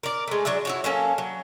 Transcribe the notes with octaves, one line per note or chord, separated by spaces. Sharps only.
A#4 D5
G#3 A3
F#3 D4 D5 E5
E4 F#4 C#5
F#3 A#3 C#4 A4
F#3